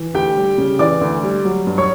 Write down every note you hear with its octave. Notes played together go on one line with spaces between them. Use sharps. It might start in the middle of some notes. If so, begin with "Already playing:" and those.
Already playing: E3
D2 G4 G5
G3
C#3
E3 D5 D6
D2
G3
F#3
G2
C#5 C#6